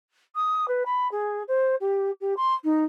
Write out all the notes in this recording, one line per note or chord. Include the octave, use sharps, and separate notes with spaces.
D#6
B4
B5
G#4
C5
G4
G4
C6
D#4